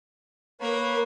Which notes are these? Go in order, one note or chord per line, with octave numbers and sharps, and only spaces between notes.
A#3 A#4 B4 C#5 B5